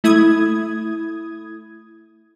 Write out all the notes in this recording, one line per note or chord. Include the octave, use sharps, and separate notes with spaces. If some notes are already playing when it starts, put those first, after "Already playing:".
A3 E4 D#6 G#6